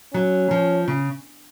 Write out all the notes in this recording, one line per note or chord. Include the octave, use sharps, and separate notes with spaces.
F#3 C#4
F3
C#3